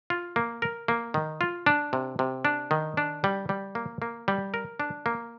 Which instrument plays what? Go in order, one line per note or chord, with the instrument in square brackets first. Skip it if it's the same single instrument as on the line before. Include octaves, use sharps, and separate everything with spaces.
[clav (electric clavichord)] F4
A#3
A#4
A#3
D#3
F4
D4
C3
C3
D4
D#3
D4
G3
G3
A#3
A#3
G3
A#4
D4
A#3